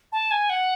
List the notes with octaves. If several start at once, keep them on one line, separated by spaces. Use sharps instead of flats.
A5
G#5
F#5